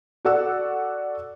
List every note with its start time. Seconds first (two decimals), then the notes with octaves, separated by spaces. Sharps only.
0.25 F#4 A4 D5 F#5 E6